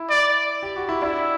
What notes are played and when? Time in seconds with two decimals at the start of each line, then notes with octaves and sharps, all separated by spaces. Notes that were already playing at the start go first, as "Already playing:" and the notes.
Already playing: E4
0.10 D5
0.63 G4
0.76 F#4
0.89 E4
1.02 D4 E4